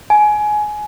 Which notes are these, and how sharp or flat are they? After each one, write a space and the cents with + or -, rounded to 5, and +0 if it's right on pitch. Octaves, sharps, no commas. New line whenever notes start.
G#5 +20